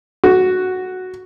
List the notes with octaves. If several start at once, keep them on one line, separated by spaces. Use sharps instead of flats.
F#4